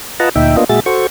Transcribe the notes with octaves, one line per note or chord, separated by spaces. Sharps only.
F4 B4 D#5 F#5 A5 A#5
D2 A#2 D#4 E5 G5
A#3 B3 D4 F4 D#5
A#2 G#3 F#4 G#4 E5 A6
F#4 A4 C5 C#6